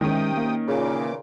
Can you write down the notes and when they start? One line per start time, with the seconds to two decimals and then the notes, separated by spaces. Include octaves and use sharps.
0.01 C3 D#3 G#3 C#4 G5 D#6
0.37 A#3
0.68 A#2 C#3 E3 D6